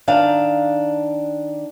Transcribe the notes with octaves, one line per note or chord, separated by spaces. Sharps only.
D#3 D4 F5 A5